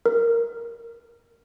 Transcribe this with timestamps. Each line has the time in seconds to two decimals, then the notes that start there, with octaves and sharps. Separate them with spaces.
0.06 A#4